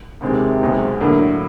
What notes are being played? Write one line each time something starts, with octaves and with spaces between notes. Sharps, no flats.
F1 D#2 C3 D#3 G#3 C4
B1 B2 G#3 C4 D#4
A2 D3 F#3 A#3